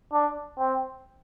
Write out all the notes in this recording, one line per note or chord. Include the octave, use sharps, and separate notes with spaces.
D4
C4